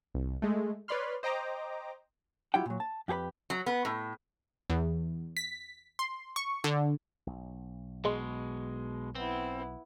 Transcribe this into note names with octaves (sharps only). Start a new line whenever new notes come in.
C2
G#3 A3
B4 C#5 D5 B5 C6 F6
C5 D#5 G5 A#5 D6
F#3 E4 F4 G4 F#5 G5
A#2 F#3
A5
F2 G4 G#4 B4 B5
F#3
B3
A2
E2
B6
C6
C#6
D3
B1
B2 G#3 G#4 D#5 C6
B3 C4 E4